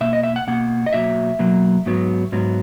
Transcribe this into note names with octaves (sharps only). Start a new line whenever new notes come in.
B2 A#3 E5
D#5
E5
F#5
B2 A#3 F#5
D#5
B2 F#3 A#3 E5
B2 F#3 A#3
G#2 F#3 B3
G#2 F#3 B3